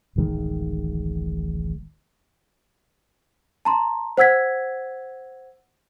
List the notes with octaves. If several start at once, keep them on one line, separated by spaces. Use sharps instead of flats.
D1 A1 D#3 G#3
A5 A#5 C6
C5 F#5 E6 G#6 B6